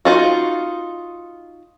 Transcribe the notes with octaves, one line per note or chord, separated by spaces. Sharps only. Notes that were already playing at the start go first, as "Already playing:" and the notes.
D#4 F4 F#4